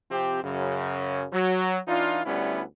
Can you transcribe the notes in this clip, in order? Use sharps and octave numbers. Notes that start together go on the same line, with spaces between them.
C3 F3 C4 G4
F#2 C#3
F#3
E3 D4 D#4 F4
D2 G3 B3 C#4 E4